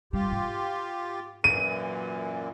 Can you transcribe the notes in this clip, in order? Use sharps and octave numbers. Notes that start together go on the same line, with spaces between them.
G3 F4 G4
G#2
F#2 A#2 E3 D#7